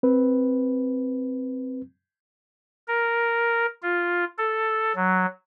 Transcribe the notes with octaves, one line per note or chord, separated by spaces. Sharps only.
C4 B4
A#4
F4
A4
F#3